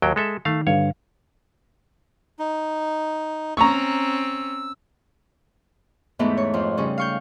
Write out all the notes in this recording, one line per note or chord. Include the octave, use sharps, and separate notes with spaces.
D#2 F#3 G5
G#3 A4 E5
D#3 A3 F5
G2 D3 C#5 F5
D#4
C4 C#4 A#5 C#6 E6
E2 G#2 E3 A3 B3 D#4
C#5
F2 F3
C#3 G3 C#4
F5 C#6 G6